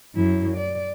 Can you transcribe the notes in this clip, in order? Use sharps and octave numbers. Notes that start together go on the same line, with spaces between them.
F#2 E4
D5